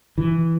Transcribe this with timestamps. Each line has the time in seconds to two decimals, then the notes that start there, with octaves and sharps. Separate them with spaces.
0.18 E3